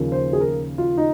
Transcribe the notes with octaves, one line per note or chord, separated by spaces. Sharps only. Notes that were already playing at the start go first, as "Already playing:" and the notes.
Already playing: D#2 C#3 F3
C5
G#4
A#4
F4
D#4